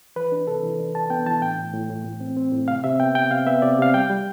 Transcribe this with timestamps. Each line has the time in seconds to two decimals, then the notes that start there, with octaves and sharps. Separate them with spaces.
0.16 E3 B4
0.32 D4
0.47 C3 A4
0.63 E3
0.79 D4
0.95 D4 A5
1.10 B3 G5
1.26 E3 A5
1.42 A2 G5
1.58 A2
1.74 A2
1.89 A2
2.05 A2
2.21 C4
2.36 C4
2.52 A2
2.68 C3 F5
2.84 C3 E5
3.00 B3 G5
3.15 C3 G5
3.31 C3 F5
3.47 B3 E5
3.62 C3 D5
3.79 C3 F5
3.94 G3 G5
4.10 G3